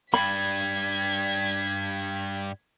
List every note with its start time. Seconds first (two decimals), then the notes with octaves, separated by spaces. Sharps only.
0.14 G2 G3 B5 G#6 B6